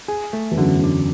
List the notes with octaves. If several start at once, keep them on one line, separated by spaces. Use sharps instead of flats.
G#4
A3
E2
F#2 D3
D3